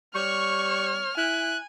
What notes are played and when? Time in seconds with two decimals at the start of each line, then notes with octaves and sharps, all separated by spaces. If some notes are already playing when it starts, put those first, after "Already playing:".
0.15 G3 C#5 C#6 F6
1.18 E4 G#5 F#6